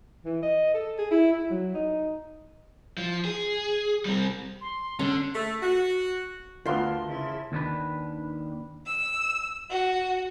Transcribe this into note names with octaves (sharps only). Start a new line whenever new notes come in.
E3
D#5
A4
G#4
E4
E4
F#3
D#4
F3
G#4
G3 C4
C6
D3 C#4
A3
F#4
D2 D3 B3 F4 A#4 A5 C6
C#3 E4
D#2 D#3 D4 B4
E6
F#4